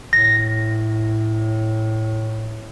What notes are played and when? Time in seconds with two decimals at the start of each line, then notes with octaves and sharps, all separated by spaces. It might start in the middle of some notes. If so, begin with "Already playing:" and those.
0.13 A2 A#6